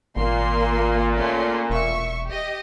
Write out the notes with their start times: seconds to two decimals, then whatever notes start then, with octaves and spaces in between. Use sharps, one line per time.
0.17 G#1 A#2 A#3 C6
1.17 A3 C#4 C6
1.70 E1 E5 C#6
2.28 G4 D#5